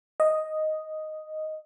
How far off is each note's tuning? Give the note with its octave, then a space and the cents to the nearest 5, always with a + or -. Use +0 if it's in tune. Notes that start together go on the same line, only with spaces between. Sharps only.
D#5 +0